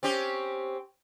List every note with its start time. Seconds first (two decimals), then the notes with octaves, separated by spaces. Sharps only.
0.03 C4 C#4 G4